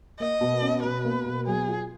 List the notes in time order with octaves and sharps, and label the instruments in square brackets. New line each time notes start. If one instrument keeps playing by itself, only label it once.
[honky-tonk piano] A#3 [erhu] D#5
[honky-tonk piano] B2
C#4
[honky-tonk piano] B2 [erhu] B4
[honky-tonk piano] A#3
B2
[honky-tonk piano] F#3 [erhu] G#4
[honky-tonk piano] F4